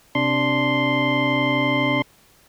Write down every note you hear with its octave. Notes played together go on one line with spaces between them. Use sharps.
C3 D4 C6